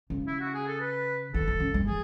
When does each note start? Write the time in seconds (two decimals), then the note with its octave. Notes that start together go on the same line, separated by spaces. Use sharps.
0.10 C#3
0.27 E4
0.40 F#4
0.54 G#4
0.67 A4
0.81 B4
1.34 D#3 A4
1.47 D#3
1.60 C#3
1.74 D#3
1.87 E3 G#4